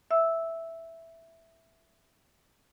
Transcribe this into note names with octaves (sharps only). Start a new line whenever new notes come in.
E5 E6